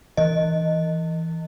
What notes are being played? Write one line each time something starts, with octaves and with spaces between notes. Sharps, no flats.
E3 D#5